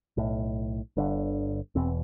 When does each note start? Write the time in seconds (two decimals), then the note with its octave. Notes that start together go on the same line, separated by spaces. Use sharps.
0.17 B1 A2
0.97 G1 G2 D3
1.75 E1 E2 B2 C4